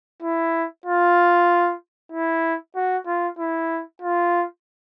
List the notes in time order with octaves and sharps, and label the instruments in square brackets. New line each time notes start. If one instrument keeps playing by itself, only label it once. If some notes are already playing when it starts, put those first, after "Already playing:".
[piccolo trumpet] E4
F4
E4
F#4
F4
E4
F4